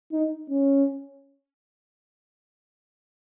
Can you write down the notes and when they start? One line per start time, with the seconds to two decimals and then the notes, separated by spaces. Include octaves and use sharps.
0.12 D#4
0.50 C#4